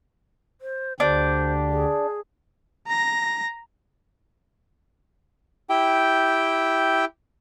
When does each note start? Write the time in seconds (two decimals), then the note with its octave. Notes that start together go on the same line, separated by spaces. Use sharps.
0.61 C5
1.00 D2 D3 D4 G4 C5
1.70 G#4
2.87 A#5 A#6
5.70 E4 G4 G5